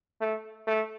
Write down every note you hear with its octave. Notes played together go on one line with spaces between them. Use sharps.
A3
A3